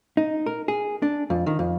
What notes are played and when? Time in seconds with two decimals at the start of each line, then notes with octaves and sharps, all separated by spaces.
0.17 D#4
0.46 A#4
0.68 G#4
1.02 D4
1.30 F2
1.46 D#3
1.59 F2